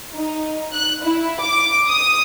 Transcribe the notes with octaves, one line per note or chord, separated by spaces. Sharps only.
D#4
F#6
E4
D6
D#6